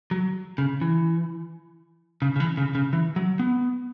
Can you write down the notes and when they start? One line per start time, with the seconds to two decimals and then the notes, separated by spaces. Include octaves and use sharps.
0.11 F#3
0.58 C#3
0.81 E3
2.22 C#3
2.36 C#3
2.40 E3
2.57 C#3
2.75 C#3
2.93 E3
3.16 F#3
3.39 B3